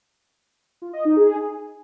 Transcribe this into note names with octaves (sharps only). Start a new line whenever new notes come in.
F4
D#5
D#4
G#4